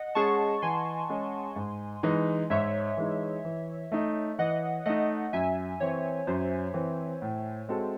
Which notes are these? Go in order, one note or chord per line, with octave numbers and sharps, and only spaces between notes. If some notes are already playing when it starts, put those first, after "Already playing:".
Already playing: D#5 F#5
G#3 C#4 G#4 A5 C#6
E3 G#5 C6
G#3 C#4 G#4
G#2
E3 G#3 D#4
G#2 C#5 E5
E3 G#3 D#4
E3
A3 D#4
E3 D#5 F#5
A3 D#4 D#5 F#5
F#2 E5 G#5
E3 C4 C#5
F#2 C5
E3 C4
A2
G#3 C4 F#4 A4